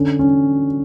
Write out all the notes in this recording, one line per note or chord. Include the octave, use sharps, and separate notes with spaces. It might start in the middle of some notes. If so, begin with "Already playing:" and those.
Already playing: D3 C#4
C#4